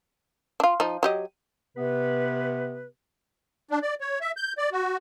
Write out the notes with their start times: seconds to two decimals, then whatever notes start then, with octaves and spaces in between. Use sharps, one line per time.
0.60 D4 F4
0.80 F3 D#4
1.03 F#3 G4 D#5
1.77 C3 B3 B4
3.71 D4
3.82 D5
4.01 C#5
4.21 E5
4.37 G6
4.58 D5
4.72 F#4